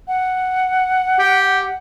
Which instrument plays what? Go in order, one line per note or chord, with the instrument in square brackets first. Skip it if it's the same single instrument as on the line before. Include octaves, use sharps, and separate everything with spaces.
[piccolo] F#5
[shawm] G4